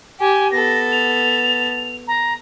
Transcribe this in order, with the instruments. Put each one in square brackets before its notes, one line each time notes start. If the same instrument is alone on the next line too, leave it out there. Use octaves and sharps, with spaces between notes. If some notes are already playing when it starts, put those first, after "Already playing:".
[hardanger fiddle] G4 [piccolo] G#5
[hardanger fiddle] B3 A4 [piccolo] A#6
[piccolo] F7
A#5